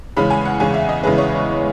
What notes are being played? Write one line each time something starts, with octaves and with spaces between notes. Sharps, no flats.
E2 C#3 G#3 C#4 B5
G#5
F#5
E2 C#3 G#3 C#4 G#5
E5
D#5
E2 C#3 G#3 C#4 B4
C#5